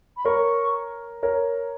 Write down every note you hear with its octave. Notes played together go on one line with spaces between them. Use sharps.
B5
A#4 C#5 C#6
A#4 C#5